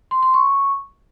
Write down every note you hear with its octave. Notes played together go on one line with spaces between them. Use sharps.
C6
C6
C#6